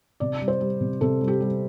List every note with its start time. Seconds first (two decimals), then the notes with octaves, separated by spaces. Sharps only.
0.20 C3 D5
0.41 G3
0.48 C5
0.60 G3
0.81 C3
1.01 C3 A4
1.21 G3
1.28 G4
1.41 G3